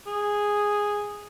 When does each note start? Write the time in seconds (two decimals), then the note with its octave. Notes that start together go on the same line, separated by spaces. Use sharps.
0.07 G#4